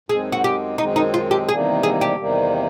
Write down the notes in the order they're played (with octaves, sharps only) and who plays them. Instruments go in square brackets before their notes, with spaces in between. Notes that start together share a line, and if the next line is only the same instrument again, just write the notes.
[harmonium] F#2 D#3 G#3 C4 [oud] G#4
[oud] F#4
G4
[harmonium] F#2 D#3 G#3 C4 [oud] D#4
[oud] D#4
F4
G4
[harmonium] E2 C3 D#3 G3 A#3 [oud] G#4
[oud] G#4
G4
[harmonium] E2 C3 D#3 G3 A#3